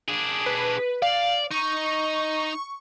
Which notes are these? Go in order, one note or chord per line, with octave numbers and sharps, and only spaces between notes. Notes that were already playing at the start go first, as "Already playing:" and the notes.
D4 G#4
B4
D5 F5
D#4 C#6